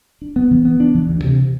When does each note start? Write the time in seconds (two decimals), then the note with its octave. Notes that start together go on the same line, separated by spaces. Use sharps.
0.22 D4
0.36 B3
0.51 E3
0.65 B3
0.80 D4
0.95 E3
1.09 D2
1.25 C3